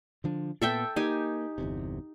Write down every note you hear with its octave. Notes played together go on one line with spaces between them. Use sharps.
D3 F3 D4
A#2 B3 A4 E5 G5
A#3 D#4 G4 G#5
G1 E2 C3